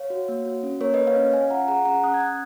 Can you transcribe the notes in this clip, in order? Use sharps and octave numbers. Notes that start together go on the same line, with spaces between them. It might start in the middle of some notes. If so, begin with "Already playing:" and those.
Already playing: C#5 F5
F#4
A#3
F#4
C#4
A#3 A#4 C#5
A#3 B4 D#5
C#5 F5
C#4
C#4 F5 G#5
F4 F#5 A#5
G#4 F#5 A#5
C#4 F#5 A#5
C#4 D#6 F#6
G#6
C#4 D#6 F#6